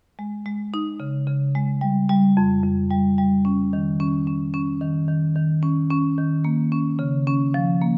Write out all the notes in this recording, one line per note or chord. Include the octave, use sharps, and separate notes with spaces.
G#3
G#3
D#4
C#3
C#3
G#3
G3
G3
F2
F2
G3
G3
C#4
D#3
C#4
C#4
C#4
D#3
D#3
D#3
C#4
C#4
D#3
A#3
C#4
C#3
C#4
F3
A#3